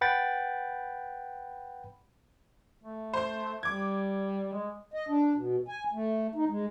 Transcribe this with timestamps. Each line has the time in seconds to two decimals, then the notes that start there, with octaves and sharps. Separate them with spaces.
0.01 B4 F#5 G5 B5 A6
2.83 A3
3.14 C5 C6
3.63 G3 D6 G#6
4.54 G#3
4.94 D#5
5.09 D4
5.36 B2
5.68 G#5
5.93 A3
6.35 D#4
6.49 G#3